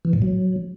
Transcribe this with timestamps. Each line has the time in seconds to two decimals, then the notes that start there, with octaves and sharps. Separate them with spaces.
0.05 E3
0.13 A2
0.22 F#3